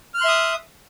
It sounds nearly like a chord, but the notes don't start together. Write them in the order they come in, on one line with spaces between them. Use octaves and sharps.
F6 F#6 C6 E5 D#6